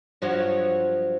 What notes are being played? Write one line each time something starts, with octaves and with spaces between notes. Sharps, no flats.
G2 F3 F#3